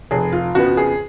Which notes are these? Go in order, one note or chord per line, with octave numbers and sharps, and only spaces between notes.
F1 G#4
F4
F2 C#3 F3 B3 F#4
G#4